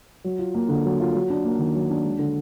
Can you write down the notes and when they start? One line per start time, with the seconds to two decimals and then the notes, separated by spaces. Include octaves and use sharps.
0.24 F#3
0.39 F4
0.54 A#3
0.69 D3
0.85 F#3
1.00 F4
1.15 F#3
1.30 D4
1.44 A#3
1.59 D#3
1.75 F#3
1.90 D4
2.04 G#3
2.19 D3